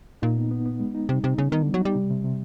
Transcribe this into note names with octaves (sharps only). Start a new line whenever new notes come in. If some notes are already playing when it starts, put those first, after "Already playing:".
A#2 D#4
B3
B3
B3
G#3
D#4
C3 G3
C3 D#4
C#3 B3
D#3 B3
D3
G3
F#3
G3 D#4
C3
C3
C3